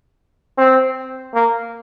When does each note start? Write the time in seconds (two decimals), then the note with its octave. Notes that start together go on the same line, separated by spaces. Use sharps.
0.58 C4
1.34 A#3